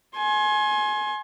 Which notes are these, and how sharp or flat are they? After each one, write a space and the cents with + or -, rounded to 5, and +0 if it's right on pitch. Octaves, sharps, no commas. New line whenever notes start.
G#5 +20 C6 +35